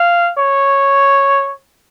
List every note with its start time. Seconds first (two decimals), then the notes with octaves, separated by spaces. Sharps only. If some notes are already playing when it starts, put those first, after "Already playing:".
Already playing: F5
0.38 C#5